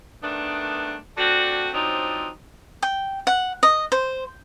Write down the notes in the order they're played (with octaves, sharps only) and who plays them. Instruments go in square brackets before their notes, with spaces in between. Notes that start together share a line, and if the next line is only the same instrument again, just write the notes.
[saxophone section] D#3 A3 B3 D4
A3 C4 D4 F#4
F3 F#3 C4 D4 D#4
[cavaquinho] G5
F#5
D#5
C5